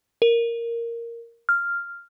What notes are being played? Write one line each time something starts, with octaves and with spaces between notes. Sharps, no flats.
A#4
F6